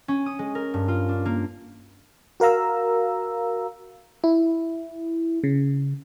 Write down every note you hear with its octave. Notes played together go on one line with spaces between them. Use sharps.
C#4
D#6
G#3
A#4
G2
F4
D4
A#3
F#4 A#4 F5 A#5 E6
E4
C#3